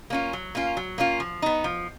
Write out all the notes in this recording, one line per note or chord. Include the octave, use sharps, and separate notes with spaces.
A#3 C#4 F4
F#3
A#3 C#4 F4
F#3
A#3 C#4 F4
F3
B3 D#4
F3